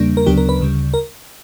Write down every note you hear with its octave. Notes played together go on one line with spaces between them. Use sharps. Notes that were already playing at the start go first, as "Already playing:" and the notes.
Already playing: E2 C#3 G3 A#3 D4
A#4
D2 C#3 F#3 B3 D4 G4
A#4
B4
D2 C#3 G3
A#4